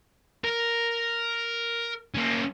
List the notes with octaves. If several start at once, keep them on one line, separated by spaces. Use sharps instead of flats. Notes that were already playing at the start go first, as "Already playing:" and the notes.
A#4
A#3 C#4